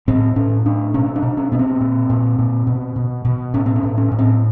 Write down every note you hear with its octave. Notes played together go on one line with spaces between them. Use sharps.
A2 C4
A2 C#4
A2 D4
B2 C#4
D4
B2
C#4
B2 B3
C4
A#2
A#2
A#2
B2
B2
B2
A2 C#4
C4
C#4
A2
C#4
A2
C4